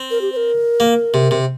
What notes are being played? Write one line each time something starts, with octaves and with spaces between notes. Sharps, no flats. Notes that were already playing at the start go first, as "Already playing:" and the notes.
Already playing: C4
A#4
G4
C5
A#4
A#3
C3
C3